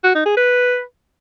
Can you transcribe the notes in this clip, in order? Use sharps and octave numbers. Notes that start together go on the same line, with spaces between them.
F#4
D#4
G#4
B4